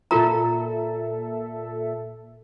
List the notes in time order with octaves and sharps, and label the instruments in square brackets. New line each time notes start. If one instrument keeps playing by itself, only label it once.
[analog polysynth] A#2 A4 E5 [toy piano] F4 A#4 A#5